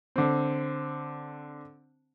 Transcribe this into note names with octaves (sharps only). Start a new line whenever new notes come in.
D3 C4